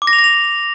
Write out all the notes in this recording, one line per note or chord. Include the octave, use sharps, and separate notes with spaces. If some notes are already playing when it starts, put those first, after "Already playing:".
D6
A#6
F7
A#6
F7